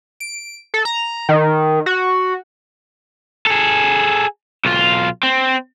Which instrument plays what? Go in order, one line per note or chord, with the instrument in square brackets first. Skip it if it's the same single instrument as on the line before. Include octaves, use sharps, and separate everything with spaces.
[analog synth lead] D7
A4
A#5
D#3
F#4
[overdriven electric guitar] G#4 A4
B1 F4
C4